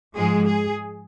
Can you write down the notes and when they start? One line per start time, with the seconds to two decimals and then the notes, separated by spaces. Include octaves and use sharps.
0.15 G#2 F3 G#3 G#4
0.47 G#4